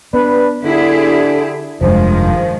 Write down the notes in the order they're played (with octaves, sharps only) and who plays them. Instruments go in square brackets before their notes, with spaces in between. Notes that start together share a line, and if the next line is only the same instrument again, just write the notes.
[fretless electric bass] B3 [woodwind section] D4 B4
[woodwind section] D3 [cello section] E4 G4 G#4
[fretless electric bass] F1 G2 [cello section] D#3 G#3 [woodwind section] F3